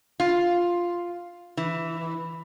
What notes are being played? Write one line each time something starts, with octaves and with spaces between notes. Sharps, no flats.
F4
E3